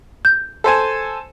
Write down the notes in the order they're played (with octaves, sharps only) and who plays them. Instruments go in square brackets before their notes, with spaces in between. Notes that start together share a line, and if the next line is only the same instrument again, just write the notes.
[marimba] G6
[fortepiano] A4 C5 G#5